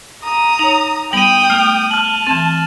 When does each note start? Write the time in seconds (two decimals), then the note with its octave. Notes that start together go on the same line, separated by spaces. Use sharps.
0.23 A#5 D#6
0.59 D#4 C#5 F7
1.13 G3 B3 G5 D#6 D#7 F#7
1.50 A3 F6 F7
1.91 A5 F6 F#7
2.27 E3 C4 A6 E7